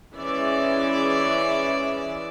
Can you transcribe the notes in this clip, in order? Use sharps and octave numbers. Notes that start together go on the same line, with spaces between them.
E3 G#3 C#4 E4 D5 E5